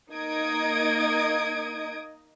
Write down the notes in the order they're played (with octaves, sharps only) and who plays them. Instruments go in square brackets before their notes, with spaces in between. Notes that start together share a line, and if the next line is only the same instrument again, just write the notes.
[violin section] A#3 D#4 D#5 D#6 G#6 D7